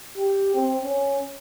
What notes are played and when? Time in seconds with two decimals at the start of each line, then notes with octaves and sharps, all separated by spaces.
0.17 G4
0.55 C4
0.84 C#4